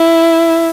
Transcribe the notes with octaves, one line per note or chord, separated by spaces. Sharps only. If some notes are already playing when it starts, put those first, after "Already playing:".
Already playing: E4